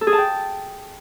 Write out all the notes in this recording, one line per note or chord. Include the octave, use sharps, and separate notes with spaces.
A4
G#4
A5
G5